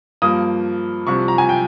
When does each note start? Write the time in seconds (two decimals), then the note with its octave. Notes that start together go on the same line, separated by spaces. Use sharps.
0.22 G2 F3 A#3 D#6
1.07 C2 C3 F3 C#6
1.28 A#5
1.38 G#5
1.49 G5